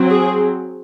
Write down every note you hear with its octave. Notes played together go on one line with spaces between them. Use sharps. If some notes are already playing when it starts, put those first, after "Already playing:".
Already playing: F#3 C4
G#4